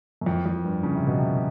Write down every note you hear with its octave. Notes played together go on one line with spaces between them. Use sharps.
F#2
F2
F2
G2
C#3
C3
B2
C3